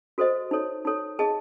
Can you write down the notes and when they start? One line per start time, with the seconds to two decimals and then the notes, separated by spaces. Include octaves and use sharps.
0.18 F#4 A4 C5 D#5
0.51 D#4 A4 C#5
0.85 D#4 A4 C#5
1.19 G#4 D#5 A5